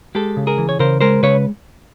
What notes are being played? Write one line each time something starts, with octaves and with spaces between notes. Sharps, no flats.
G#3 G4 A4
C#3
G#4 A#4
E3
C#5
C#3 A#4 C5
G#3 A#4 C5
C#3 B4 C#5